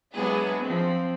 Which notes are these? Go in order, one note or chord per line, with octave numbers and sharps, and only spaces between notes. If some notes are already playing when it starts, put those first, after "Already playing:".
F#3 G#3 B3 D4 E4 G#4
F3 C4